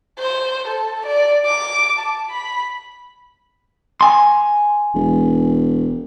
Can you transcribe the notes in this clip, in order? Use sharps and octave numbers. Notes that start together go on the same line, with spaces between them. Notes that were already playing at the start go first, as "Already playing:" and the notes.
C5
A4
D5
D6
A5
B5
G#5 C6
E1